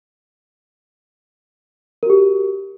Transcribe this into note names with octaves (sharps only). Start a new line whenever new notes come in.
F#4 G4 A#4